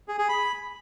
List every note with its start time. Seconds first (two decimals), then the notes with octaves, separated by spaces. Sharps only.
0.08 G#4
0.19 G#4
0.29 B5